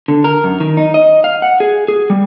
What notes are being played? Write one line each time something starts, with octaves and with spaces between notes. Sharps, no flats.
D3
A#4
F#2
D#3
D#4
D#5
F5
F#5
G#4
G#4
G3